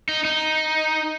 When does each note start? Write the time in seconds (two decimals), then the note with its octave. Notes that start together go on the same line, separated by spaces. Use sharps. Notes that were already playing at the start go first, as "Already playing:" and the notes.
0.09 D#4
0.25 D#4